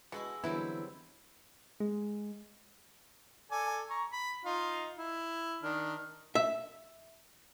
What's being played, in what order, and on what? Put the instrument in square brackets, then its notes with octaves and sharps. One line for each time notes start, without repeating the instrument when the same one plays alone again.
[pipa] B2 [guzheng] G#3 E4 F#4
[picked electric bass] D3 E3 B3 [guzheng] F#3 G3 C4 [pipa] E4
[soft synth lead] G#3
[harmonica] A4 D5 G#5
A#5 C#6
B5
D#4 F4 F5
E4
D#3 D4 F6
[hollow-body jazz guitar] E5